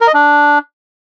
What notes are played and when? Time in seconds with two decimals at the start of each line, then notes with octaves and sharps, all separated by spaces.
0.01 A#4
0.07 D#5
0.14 D4